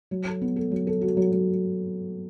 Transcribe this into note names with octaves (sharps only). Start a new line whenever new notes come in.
F#3
A4
B3
A4
F#3
A4
F#4
F#3
F#3